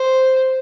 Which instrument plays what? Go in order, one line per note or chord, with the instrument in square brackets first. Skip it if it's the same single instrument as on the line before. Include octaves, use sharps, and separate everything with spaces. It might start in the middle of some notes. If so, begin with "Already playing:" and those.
Already playing: [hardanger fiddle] C5